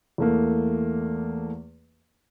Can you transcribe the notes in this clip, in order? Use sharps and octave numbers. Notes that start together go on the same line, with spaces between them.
E2 A3 A#3